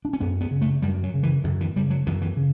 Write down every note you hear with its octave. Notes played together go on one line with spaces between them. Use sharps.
D4
C#4
F#2 B3
B3
C#3
A3
F#2 G3
F#3
C#3
E3
F#2 D3
E3
C#3 G3
F#3
F#2 E3
E3
C#3